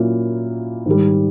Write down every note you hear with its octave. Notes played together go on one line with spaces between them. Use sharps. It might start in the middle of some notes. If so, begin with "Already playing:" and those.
Already playing: A#2 F#3 A#3 C#4 E4
G#2 D#3 G3